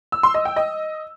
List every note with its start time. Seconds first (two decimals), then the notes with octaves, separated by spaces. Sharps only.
0.12 E6
0.23 C6
0.34 D#5
0.45 G5
0.56 D#5